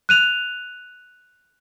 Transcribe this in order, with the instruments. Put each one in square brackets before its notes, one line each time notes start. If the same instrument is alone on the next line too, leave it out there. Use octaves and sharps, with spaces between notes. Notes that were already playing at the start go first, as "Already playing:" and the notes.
[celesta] F#6 D#7 F7